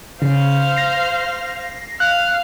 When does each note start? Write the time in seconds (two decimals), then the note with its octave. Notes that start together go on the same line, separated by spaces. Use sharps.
0.22 C#3 C5 F5
0.76 A#6 C7
2.00 F5 F#6